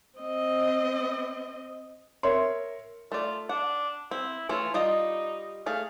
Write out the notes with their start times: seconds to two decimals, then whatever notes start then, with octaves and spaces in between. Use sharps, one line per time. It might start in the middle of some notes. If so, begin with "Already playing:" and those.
0.19 C4 D#5
2.23 A#4 C#5 E5 C6
3.12 A3 F4 D5
3.49 D4 F#5
4.11 C4 E4
4.49 E3 A3 C#4 F4
4.74 G3 D#4 F4 D#5
5.66 A3 G#4 F5